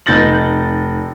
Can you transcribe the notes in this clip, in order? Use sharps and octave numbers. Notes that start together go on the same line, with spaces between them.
F1 D#4 G6 A6 A#6 F#7